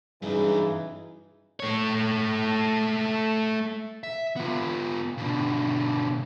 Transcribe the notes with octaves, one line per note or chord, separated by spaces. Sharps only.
B1 G2 C#3 E3 D#4 G#4
A3 C#5
E5
B3 F4
B2 D3